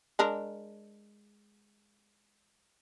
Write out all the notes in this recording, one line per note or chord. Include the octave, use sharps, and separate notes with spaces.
G#3 D4 A#4